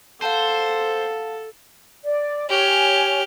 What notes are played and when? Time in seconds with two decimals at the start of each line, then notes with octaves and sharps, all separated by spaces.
0.22 A4 C5 F5 F#5 A5
2.04 D5
2.49 G4 C#5 G#5 F6